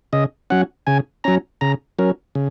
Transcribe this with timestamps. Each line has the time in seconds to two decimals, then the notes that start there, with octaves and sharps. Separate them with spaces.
0.13 C#3 D#5
0.50 F#3 C#4 F#5
0.87 C#3 G#5
1.24 F#3 C#4 A#5
1.61 C#3 A#5
1.98 F#3 C#4 A#4
2.35 C#3